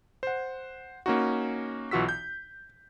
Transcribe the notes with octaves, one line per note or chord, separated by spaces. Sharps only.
C5 F#5
A#3 C#4 D#4 F#4
B1 E3 F4 F#4 E6 B6
G6